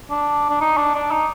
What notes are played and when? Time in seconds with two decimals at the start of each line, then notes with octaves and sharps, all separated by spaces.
0.10 D4
0.49 D4
0.61 D#4
0.77 D4
0.95 D4
1.11 D#4